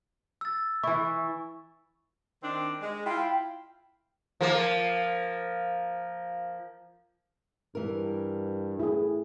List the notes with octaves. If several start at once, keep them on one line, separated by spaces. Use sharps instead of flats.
E6 A6
E3 E4 C#6
D#3 C4 D4
G#3
E4 F4 G5
F3 A#3
G2 E3 A#4
A2 E4 G#4